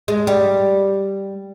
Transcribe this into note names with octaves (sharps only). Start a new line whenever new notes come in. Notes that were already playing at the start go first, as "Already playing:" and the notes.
G#3
G3